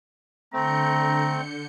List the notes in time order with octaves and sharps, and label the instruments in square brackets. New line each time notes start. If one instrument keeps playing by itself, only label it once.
[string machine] D3 G6 C#7 [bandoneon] A3 C4 [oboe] A#5